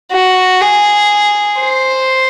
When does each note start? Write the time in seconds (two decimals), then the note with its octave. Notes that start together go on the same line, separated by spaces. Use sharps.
0.12 F#4
0.61 G#4
1.60 C5